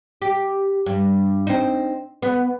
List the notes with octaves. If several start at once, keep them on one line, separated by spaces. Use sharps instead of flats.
G4
G2
C4 D#4
B3